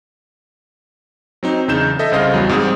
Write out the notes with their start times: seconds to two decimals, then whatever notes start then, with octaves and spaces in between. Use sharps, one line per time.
1.43 F#3 C4 D#4
1.68 E2 C#3 D#4 G6 E7
1.99 A4 D#5 E5
2.12 C2 C#3 C5 D#5 F5
2.34 E2 F#3 G3
2.49 G#2 G3 C4 G#4 D#6